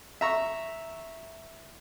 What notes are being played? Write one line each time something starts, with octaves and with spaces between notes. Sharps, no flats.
E5 A#5 C#6